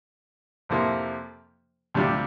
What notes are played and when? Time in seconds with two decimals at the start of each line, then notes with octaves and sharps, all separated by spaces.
0.69 F2 C3 F3 A#3 E4
1.94 D2 C3 G3 D4 F4